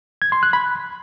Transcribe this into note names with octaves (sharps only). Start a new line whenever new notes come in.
G#6
C6
F#6
B5